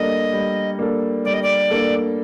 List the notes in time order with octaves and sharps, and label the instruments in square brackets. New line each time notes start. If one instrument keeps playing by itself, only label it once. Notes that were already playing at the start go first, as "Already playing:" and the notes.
Already playing: [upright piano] G3 A#3 D4 A4 [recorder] D#5
[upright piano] G3
A#3 D4 A4
[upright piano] G3 [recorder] D5
[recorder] D#5
D5
[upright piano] A#3 D4 A4